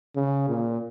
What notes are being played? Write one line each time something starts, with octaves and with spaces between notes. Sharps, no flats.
C#3
A#2